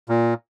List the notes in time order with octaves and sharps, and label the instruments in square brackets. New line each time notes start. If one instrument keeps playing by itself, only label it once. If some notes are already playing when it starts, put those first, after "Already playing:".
[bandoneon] A#2